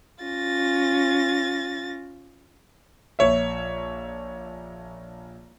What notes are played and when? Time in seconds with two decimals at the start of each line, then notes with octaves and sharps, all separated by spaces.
0.23 C#4 F4 A6 A#6
3.19 A#1 C#5 E5